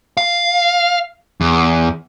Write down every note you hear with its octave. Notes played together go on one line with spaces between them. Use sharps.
F5
E2